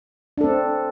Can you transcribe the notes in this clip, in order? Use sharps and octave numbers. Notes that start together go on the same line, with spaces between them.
C4 D4 A4